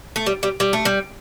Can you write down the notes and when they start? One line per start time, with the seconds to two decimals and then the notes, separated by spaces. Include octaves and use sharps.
0.16 A3
0.26 G3
0.43 G3
0.60 G3
0.73 A3
0.85 G3